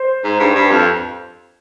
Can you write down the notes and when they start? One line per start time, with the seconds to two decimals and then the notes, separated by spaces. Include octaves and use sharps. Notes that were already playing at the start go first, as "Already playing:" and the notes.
Already playing: C5
0.24 G#2
0.40 G2
0.55 G2
0.71 F2